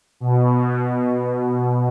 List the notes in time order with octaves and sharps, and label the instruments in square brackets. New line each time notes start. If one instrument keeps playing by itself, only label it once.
[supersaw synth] B2